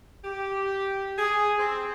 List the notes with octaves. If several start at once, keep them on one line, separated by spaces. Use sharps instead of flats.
G4
G#4
C4